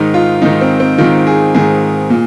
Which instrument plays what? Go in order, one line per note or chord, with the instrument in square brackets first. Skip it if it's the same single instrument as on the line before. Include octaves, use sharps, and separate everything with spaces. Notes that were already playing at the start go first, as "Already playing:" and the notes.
Already playing: [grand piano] G#2 D#3 D#4
F4
G#2 D#3 D#4
C4
C4
G#2 D#3 F4
G#4
G#2 D#3 G#4
A#2